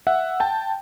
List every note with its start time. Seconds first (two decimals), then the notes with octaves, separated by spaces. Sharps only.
0.07 E5 F#5
0.40 G5 A5